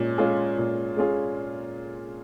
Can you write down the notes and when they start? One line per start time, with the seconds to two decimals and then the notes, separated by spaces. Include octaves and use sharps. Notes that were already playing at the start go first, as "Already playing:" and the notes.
Already playing: A#2 G#3 C#4
0.18 G#3 C#4 F4 G#4
0.58 A#2
0.97 G#3 C#4 F4 G#4